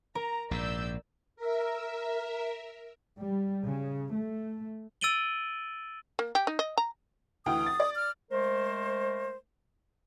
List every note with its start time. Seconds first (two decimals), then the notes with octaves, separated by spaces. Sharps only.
0.15 A#4 A#5
0.51 A#1 G#2 D5 E6 G6
1.36 A#4 E5
3.19 G3
3.65 C#3
4.14 A3
5.01 E6 A6 D7 D#7 F#7 G7
6.19 A#3
6.35 G4
6.47 D#4
6.59 D#5
6.78 A#5
7.46 D2 E3 G5 D#6
7.66 A6
7.80 D5
7.95 F6
8.31 G#3 A3 A#4 C5